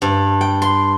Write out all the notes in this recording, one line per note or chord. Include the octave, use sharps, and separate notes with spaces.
G2
G5
C6